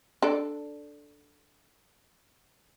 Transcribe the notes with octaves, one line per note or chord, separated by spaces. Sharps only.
D4 A4 D5